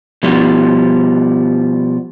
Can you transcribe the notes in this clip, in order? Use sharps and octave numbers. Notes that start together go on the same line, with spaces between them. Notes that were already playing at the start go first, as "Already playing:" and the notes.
B2 F3 G3